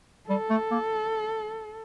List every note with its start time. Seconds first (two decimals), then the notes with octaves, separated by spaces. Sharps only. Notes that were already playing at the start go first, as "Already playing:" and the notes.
0.29 G3 A4
0.50 A3
0.71 A#3